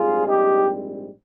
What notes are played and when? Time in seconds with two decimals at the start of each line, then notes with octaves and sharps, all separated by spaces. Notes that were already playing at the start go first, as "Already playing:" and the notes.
Already playing: A#1 G#2 G3 C4 F4 G#4
0.26 D#4 G4